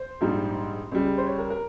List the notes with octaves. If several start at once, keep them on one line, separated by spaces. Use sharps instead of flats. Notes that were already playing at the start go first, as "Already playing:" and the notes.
Already playing: C5
A#1 G#2 G3
C#2 C#3 G3
C5
C#5
A#4
A#4